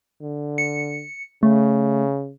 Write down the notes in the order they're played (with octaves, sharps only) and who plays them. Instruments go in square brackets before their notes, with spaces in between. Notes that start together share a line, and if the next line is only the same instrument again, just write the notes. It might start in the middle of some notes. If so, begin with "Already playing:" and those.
[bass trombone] D3
[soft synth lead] C#7
[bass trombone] C#3 [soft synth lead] A3